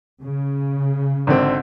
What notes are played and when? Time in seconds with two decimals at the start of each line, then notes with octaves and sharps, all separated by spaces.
0.20 C#3
1.27 G#1 D3 C4